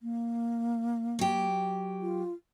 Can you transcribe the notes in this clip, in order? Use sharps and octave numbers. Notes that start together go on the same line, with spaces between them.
A#3
F#3 G4
F4